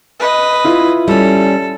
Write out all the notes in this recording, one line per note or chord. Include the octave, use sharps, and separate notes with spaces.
B4 D#5
E4 F4
G3 C#4 A4